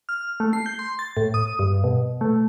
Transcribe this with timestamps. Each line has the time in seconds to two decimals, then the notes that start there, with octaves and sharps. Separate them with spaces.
0.09 F6
0.40 A3
0.53 C7
0.66 G6
0.79 C6
0.99 A6
1.17 A2
1.34 D#6
1.59 G2
1.84 B2
2.21 A3